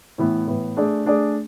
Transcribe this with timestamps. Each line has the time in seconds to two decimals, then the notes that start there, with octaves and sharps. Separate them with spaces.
0.18 A2 E3 B3
0.48 A2 E3 B3
0.77 A3 D4 G#4 D5
1.05 A3 D4 G#4 D5